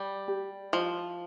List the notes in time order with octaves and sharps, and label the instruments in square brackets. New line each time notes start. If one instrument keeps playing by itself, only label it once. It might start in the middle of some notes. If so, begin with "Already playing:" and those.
Already playing: [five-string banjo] G3 [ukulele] D5
[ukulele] G4
[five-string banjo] F3 [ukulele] D#5